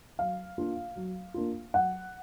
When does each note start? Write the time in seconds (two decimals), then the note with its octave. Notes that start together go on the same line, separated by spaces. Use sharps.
0.19 F#3 F5
0.58 A#3 D4 F4
0.96 F#3
1.34 A#3 D4 F4
1.74 F#3 F#5